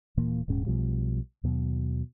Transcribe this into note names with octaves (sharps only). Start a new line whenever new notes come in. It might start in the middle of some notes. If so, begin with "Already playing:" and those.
D#1 A#2 E3 A#3
D#1 G#2 G#3 C#4
B1 B2 F3 G3
D#2 B2 F#3